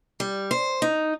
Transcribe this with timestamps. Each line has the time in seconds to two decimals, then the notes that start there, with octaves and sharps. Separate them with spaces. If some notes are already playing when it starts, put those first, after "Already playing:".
0.20 G3
0.51 C5
0.82 D#4